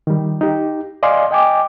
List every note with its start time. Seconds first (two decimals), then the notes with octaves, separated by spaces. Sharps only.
0.07 D#3 G3
0.41 D#4 G4
1.03 D5 D#5 F5 G#5 C6
1.31 D#5 G5 G#5 D6